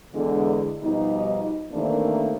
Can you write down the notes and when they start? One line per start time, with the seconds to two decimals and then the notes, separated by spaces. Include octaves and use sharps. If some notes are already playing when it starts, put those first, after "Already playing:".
0.13 E2 D3 G#3
0.82 B2 F3 G3 D#4
1.72 C3 D#3 E3 A3 A#3 D4